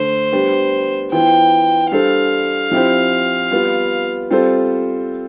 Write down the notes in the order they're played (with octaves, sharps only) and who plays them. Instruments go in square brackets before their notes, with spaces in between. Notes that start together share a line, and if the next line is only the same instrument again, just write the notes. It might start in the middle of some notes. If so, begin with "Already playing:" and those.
Already playing: [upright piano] D3 A3 D4 [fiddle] C5
[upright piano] G3 B3 D4 G4
[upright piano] E3 B3 F4 C5 [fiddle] G5
[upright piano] G3 D4 A4 C5 [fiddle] F5
[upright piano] F3 C4 E4 G4 C5
G3 B3 F4
G3 C4 F4 A4 C5